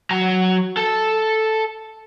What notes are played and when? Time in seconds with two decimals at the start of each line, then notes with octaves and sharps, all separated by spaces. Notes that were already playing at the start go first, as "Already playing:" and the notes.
0.11 F#3 A#5
0.77 A4